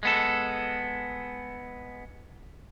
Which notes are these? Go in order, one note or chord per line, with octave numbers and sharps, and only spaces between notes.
G#3 B3 A4